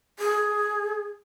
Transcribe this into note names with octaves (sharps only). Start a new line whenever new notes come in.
G#4